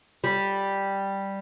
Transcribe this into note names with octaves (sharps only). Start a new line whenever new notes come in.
G3